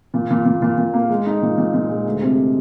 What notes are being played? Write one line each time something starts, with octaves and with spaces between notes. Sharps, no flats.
A#2
A#2
A#2
A#2
A#2
A#3
G#3
D#4
A#2
A#2
A#2
G#3
D2
C3